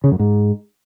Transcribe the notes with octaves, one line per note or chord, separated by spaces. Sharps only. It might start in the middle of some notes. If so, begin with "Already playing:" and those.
C#3
F#2
G#2